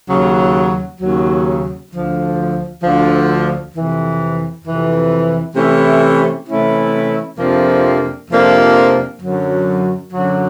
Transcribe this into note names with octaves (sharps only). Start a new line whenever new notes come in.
D#2 C#3 F#3
D#2 C#3 F#3
D2 D3 F3
D2 D3 F3
F2 C3 E3
F2 C3 E3
C3 E3 A3 C#4 E4
C3 E3 A3 C#4 E4
F2 C3 F3 A#3 D4
F2 C3 F3 A#3 D4
F#2 D3 F#3
F#2 D3 F#3